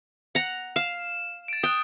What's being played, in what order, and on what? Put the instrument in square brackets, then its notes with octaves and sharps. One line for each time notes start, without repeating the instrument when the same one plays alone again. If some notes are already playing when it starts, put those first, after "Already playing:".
[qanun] F#5 A#5
[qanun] F5 [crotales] E7
[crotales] A6 D7
[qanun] G5 [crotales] D#6 F#6